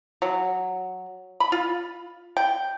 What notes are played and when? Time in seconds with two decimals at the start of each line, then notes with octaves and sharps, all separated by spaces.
0.22 F#3
1.40 B5
1.52 F4
2.37 G5